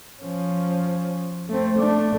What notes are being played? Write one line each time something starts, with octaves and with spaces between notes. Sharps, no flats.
F3 C#4
A3 C4
A3 D4